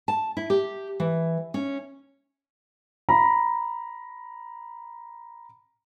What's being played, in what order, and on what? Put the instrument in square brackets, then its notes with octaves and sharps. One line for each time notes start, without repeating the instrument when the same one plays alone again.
[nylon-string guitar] A5
E4
G4
E3
C#4
[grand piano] A#5 B5